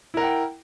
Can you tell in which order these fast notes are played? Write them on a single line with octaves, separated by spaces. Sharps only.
E4 A#4 F#5 G5